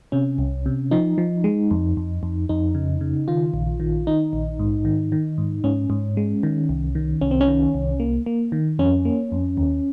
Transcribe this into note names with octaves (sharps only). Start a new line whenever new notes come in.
C3 C#4
C2
C3
F3 D#4
F3
G#3
F2
F2
F2
F2 D#4
C#3
C#3
D#3 F4
A#1
D#3
D#3 D#4
A#1
G#2
D#3
D#3
G#2
G#2 C#4
G#2
G#3
D#3
C2
D#3
C2 C#4
C4
C#4
D#3
C2
A#3
A#3
D#3
F2 C#4
A#3
F2
D#2